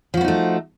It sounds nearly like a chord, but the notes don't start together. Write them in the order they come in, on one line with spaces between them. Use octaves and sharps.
F3 F#4 B3 D#4 A3